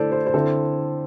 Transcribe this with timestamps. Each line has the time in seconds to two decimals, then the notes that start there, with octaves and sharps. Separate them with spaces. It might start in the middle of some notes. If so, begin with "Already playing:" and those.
Already playing: D3 A3 E4 A4 C5 D5
0.12 C5
0.26 C5
0.34 D3 C4 E4 A4